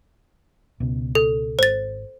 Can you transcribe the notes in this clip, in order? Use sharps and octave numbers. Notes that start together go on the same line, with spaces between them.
C#2 B2
A4
G#1 C5 A6